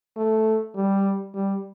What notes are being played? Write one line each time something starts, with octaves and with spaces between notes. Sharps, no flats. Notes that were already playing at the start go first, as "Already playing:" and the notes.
A3
G3
G3